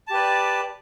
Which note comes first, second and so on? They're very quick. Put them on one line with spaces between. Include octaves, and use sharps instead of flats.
A5 G4 B4 D5